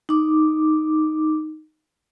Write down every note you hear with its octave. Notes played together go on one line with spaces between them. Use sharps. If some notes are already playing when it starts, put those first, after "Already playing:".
D#4 D6